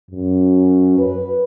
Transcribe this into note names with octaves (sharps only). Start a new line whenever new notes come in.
F#2
B4